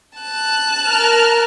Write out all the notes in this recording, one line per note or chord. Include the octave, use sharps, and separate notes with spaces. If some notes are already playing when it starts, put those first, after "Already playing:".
A5 F#6
A#4 F6